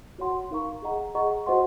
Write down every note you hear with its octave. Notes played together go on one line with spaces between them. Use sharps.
F#4 C#5 F#5 C6
D#4 A#4 F5 A#5 C#6
G#4 D#5 F#5 A#5
G#4 D#5 F#5 A#5 C#6
F#4 C5 D#5 F#5 C6